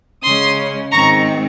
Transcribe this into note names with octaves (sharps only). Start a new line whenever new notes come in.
C#3 G#3 C#4 C6 D#6
G#2 D#3 G#3 C4 A#5 C#6